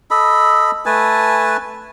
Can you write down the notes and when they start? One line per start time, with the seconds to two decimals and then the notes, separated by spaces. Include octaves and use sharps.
0.11 A4 D#5 B5
0.86 A3 B4 G#5 A5